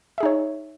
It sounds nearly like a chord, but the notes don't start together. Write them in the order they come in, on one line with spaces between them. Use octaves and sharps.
E5 G#4 D#4 C#5